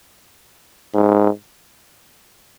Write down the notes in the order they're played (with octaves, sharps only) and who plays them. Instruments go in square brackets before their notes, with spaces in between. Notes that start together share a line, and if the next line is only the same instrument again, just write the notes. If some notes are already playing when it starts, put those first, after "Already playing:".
[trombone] G#2